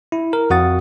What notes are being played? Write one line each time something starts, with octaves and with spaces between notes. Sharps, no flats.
E4
A#4
F2 F#4 F#5 D#6 A6